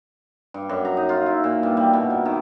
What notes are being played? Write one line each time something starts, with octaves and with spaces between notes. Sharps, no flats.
G2
F#2
A#5
D#4
F4
E4
A#2
G2
G3
B2
A#4
D#3